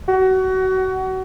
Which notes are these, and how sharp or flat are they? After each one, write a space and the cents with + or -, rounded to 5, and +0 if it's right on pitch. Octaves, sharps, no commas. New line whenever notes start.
F#4 +25